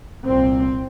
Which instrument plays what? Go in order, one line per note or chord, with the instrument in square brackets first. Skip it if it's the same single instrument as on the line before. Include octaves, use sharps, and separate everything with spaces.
[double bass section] C2 A#2 C4